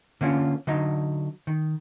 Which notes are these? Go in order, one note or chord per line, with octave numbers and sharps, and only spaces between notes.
D3 A#3 C#4 F4
D3 F#3 D#4
D#3